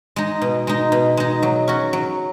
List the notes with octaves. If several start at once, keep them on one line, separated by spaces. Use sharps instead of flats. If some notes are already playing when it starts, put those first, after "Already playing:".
G#3 D#4
B2
G#3 D#4
B2
G#3 D#4
F#3
C#4 F#4
F#3